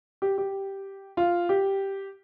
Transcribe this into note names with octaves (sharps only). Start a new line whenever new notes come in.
G4
G4
F4
G4